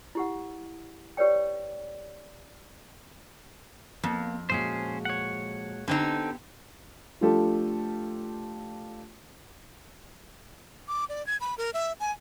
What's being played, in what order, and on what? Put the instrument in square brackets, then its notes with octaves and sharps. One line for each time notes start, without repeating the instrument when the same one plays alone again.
[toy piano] E4 G4 F#5
G4 B4 C#5 D5 G5
[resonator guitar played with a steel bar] F2 [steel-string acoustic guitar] A#3 B3
[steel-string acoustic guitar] A#2 G#3 F#4 [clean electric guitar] C#4 G#4 C5
[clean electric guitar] C#5 F#5
[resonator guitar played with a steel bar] D3 C4 D#4 [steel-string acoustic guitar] B3 G4
[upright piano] F3 A3 D4 F4 G4 A4
[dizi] D6
D5
G#6
B5
A#4
E5
G#5